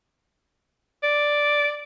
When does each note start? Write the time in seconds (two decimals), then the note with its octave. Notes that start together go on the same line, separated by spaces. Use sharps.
1.04 D5